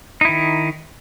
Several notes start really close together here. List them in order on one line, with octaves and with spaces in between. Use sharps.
D#4 E4 D#3